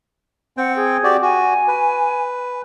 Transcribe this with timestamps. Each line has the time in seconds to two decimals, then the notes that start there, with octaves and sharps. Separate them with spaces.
0.57 C4 F#5 G5
0.76 G#4
1.04 F#4 G4 D5
1.22 F#4 G#5
1.68 B4